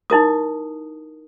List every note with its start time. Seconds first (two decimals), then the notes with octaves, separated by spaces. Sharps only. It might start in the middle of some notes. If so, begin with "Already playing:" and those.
0.10 D#4 E4 A#4 D#6